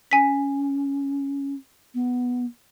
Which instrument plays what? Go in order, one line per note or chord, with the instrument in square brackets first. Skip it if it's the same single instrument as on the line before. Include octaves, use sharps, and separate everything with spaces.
[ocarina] C#4 [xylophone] G#5 B6
[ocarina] B3